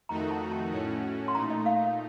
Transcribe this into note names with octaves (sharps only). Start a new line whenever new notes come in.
F2 D#3 A3 D#4 F#4 A#5
A5
A5
A2 A3 C#4 F#4
C6
A#2 A3 D#4 A#5
D#5
F5